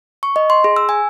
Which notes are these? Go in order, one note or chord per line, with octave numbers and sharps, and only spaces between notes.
C#6
D#5
C6
G#4
E6
G#5